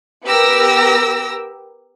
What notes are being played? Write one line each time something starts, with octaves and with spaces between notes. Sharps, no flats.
B3 G4 A#4 E6 A#6